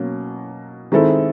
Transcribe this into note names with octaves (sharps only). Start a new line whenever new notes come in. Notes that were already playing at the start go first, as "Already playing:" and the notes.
Already playing: B2 F#3 A#3 C#4
D#3 G#3 C4 E4 A4